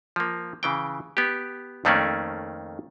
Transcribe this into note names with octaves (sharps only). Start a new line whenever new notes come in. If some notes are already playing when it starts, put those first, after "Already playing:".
F3 A#3
C#3 E3 G5
B3 G4
F2 D#3 A3 A#3 C#4 D5